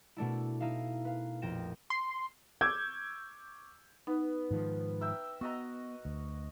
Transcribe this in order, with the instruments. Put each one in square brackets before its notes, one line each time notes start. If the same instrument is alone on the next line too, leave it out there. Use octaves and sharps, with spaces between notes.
[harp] B2 A3 D4 E4
D#4 E4 E5 F5
B4 F5
A#1 F2 G5 A#6 E7
[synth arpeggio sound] C6
[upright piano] C#6 D6 E6 G6 G#6
[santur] B3 [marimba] D#4
[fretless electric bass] G#2 D#3 F3
[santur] A#4 E5 G5
[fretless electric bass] B3 [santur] F#4 D#5 A#5
[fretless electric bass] D2